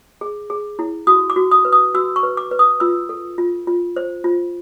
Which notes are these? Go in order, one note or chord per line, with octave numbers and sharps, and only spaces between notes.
G#4
G#4
E4
F#4 D#6
D6
F#4
D#6
B4
D#6
F#4 E6
C#6
B4
D6
B4
D#6
F4 E6
A4
F4
F4
C5
F4